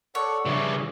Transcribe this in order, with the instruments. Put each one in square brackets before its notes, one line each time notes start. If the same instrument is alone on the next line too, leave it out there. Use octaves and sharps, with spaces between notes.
[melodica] A4 D5 F#5 [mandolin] C#5
[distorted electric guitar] C#3 E3 [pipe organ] F3 G3 D4 [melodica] D5